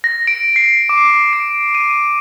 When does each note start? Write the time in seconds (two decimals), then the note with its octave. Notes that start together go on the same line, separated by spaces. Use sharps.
0.04 A#6
0.27 D7
0.56 C7
0.89 D6
1.33 D7
1.75 D#7